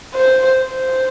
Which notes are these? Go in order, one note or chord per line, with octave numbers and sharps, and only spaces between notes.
C5
C5